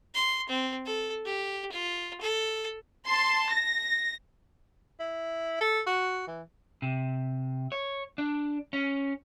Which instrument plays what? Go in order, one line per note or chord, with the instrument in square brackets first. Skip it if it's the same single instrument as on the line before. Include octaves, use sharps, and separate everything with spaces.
[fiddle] C6
C4
A4
G4
F4
A4
[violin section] A5 C6
A#6
[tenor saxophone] E4
A4
F#4
E3
[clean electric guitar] C3
C#5
D4
C#4